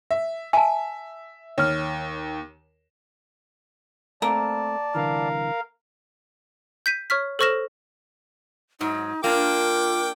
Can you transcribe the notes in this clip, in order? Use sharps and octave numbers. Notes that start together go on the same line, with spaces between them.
E5
E5 G#5 A5
D#2 C#5 F6
A3 A#3 C4 D5 A5
C2 D3 E3 A#4 F5
G6 B6 D#7
C#5 C#6 F6 B6
A4 C5 C#6 F6 A#6 E7
G#2 F#3 D#4
A#3 D4 F4 A#4 G5 D6